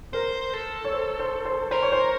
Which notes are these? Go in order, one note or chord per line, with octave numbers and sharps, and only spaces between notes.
A#4 C5
A4
C#5
C5
C5
C5
A#4 C5
C#5
C5